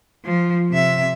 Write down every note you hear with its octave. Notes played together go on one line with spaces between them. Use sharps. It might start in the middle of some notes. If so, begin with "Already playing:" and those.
F3
C3 E5